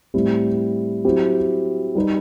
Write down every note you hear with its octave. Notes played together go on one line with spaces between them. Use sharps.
A2 G3 C4 E4
F#3 C4 E4 G4
G3 D#4 G4 B4